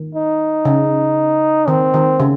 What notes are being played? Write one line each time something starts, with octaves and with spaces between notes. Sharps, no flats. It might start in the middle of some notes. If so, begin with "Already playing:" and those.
Already playing: D#3
D#4
C#3
D#3 C4
D#3
C#3